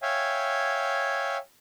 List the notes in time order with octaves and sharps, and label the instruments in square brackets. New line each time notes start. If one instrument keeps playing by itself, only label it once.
[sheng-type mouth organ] C#5 E5 F5 G5 G#5